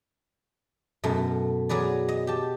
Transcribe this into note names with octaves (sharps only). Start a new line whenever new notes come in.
F#2 B2 A3
F#3 G#4 B4 D5
D#5
G4 A5